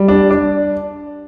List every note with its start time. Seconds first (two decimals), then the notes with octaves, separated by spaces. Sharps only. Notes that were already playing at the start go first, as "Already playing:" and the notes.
Already playing: G3
0.08 D4
0.31 D4